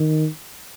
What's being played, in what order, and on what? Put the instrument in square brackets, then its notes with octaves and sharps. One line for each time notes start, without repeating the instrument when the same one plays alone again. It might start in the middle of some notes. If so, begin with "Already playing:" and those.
Already playing: [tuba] D#3